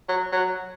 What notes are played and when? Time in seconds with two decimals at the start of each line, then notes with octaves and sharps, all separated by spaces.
0.09 F#3
0.32 F#3